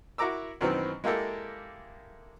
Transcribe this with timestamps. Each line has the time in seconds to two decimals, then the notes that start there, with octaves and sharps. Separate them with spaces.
0.18 E4 F#4 A#4 A#5 D6 E6
0.61 F#2 B2 D#3 E3 B3 C4
1.04 G#3 A#3 E4 G4 A4 A#4